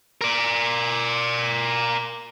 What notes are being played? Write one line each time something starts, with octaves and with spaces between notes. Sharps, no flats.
A#4 D5